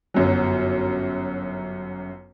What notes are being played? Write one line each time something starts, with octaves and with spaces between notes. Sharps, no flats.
G1 F#2 F#3